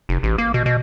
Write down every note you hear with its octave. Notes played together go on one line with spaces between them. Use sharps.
F1
A1
A#3
B2
B2